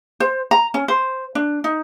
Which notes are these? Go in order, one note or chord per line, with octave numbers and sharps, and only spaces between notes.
C5
A#5
C#4
C5
D4
D#4